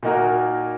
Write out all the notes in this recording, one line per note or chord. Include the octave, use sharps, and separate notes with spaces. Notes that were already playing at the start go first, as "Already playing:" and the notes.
A#2 A#3 D#4 F#4 A#4